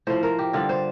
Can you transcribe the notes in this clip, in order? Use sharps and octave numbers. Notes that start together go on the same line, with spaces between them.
A2 F3 C5
A#4
G4
G2 D3 G3 F4
C5